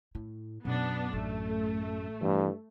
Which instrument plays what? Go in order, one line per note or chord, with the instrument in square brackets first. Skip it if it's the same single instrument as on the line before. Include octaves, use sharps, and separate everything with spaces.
[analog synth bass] A2 [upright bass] E4
[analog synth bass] F#2 [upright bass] B2 [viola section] B3 D4
[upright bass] A1 [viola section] A3
[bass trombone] G2 [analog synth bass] E3